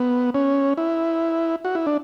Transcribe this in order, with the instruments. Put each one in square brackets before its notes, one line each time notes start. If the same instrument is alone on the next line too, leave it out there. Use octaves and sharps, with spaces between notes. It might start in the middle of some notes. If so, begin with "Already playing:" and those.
Already playing: [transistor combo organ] B3
C#4
E4
F#4
E4
D4